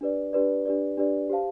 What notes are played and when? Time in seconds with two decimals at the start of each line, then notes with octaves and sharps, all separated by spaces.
0.01 D4 G4 B4 D5
0.33 D4 G4 B4 D5
0.65 D4 G4 B4 D5
0.97 D4 G4 B4 D5
1.30 G4 C5 F5 A5